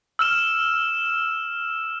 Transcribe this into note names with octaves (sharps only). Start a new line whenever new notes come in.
E6 F6 E7